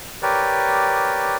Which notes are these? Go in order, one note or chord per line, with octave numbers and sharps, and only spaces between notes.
G4 A#4 B4 C#5 D5